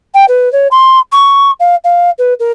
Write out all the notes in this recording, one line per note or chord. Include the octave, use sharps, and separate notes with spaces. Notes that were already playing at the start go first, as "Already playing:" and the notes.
G5
B4
C#5
C6
C#6
F5
F5
B4
A#4